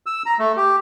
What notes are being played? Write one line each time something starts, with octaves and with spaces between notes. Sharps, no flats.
E6
A#5
A3
G4